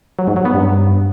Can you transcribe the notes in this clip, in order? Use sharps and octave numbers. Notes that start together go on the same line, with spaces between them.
F#3
G#2
F#3
B3
G2